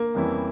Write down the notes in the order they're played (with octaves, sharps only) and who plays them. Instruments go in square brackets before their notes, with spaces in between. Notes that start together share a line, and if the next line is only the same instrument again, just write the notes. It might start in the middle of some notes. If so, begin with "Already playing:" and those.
Already playing: [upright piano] A#3
[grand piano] F2 E3 G3 C#4 E4